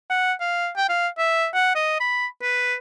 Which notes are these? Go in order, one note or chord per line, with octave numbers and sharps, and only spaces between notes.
F#5
F5
G5
F5
E5
F#5
D#5
B5
B4